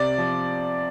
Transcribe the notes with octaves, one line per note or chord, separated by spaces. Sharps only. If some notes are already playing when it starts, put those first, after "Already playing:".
Already playing: C3 D5
F3